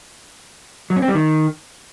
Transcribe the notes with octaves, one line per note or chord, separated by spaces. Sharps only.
F#3
C#4
C4
G3
D#3